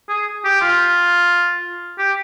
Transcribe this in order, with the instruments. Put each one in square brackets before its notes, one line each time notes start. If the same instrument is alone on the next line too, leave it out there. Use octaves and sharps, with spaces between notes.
[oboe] G#4
G4
F4
G4